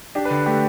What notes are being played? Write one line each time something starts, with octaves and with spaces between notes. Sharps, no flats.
D4 G4
B4
D3
A3 G4